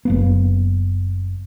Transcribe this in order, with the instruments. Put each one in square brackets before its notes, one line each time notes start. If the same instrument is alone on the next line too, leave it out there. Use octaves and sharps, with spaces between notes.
[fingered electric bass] F#1 A#3 B3